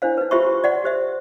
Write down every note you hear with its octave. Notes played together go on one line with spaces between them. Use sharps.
D4 E4 C5 F5
D#4 B4
F4 G4 C5 E5 C6 C#6
D5 E5 F#5 C6
G4 C5 E5